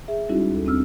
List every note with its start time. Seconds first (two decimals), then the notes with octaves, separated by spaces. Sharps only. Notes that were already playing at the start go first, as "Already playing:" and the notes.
0.08 G#4 E5
0.29 G3 G#3 C#4 D#4 E4 F#4
0.51 D#2 A4
0.66 C4 D4 E6 F6